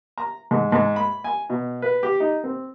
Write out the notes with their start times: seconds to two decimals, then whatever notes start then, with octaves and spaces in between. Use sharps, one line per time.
0.18 A#5
0.51 G#2
0.72 G#2
0.96 B5
1.24 G#5
1.50 B2
1.82 B4
2.03 G4
2.20 D#4
2.44 C4